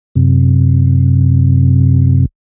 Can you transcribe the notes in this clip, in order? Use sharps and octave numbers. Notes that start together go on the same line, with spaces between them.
F#2 C3